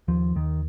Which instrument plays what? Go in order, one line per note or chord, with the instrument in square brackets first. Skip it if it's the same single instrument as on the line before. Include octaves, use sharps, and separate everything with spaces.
[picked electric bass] D#2 F3
D#2 D#3